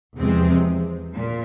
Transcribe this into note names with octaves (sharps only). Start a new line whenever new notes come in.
E2 C3 F3 G#3 C4
A#2